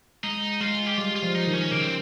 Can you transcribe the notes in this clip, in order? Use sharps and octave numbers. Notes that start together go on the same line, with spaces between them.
G#3 D#4
G#3 F4
G4
G3 F4
F4
F3
D#4
D#3
C#4
C#3 A#3
C4